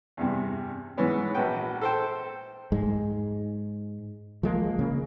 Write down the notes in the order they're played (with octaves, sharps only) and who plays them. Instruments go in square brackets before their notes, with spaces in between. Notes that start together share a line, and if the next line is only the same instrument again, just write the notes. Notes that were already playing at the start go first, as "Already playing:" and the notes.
[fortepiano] E2 G2 C3
G#2 E3 B3 C#4
A#1 F#4 B4 G5
A4 C5 G5
[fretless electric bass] G#2 G#3
F3 G#3 A#3
C#3 A#3